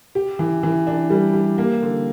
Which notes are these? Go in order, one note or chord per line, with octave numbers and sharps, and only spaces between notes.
G4
E3
E3
D4
G3
G4
A#3
D3